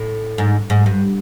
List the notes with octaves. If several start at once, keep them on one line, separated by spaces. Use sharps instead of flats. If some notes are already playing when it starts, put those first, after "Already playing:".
Already playing: A2
G#2
G#2
G2